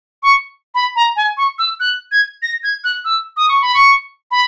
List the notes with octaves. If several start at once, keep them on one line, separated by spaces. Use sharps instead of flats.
C#6
B5
A#5
G#5
C#6
E6
F#6
G#6
A#6
G#6
F#6
E6
D#6
C#6
B5
C#6
B5